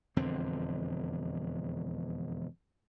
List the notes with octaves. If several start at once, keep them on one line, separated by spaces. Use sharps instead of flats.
E1 F2 D3 C4